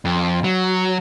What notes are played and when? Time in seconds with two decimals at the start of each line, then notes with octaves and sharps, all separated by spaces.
0.05 F2
0.44 F#3